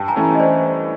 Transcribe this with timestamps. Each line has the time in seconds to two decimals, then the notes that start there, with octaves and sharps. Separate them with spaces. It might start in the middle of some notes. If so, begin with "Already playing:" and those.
Already playing: G2 G5 A5
0.08 G#5 A#5
0.16 E3 A3 C#4
0.35 D#5
0.40 C5 D5